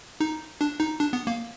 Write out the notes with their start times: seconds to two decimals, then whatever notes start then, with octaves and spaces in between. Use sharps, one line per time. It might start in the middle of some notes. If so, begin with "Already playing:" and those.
0.20 D#4
0.61 D4
0.80 D#4
1.00 D4
1.13 B3
1.27 A#3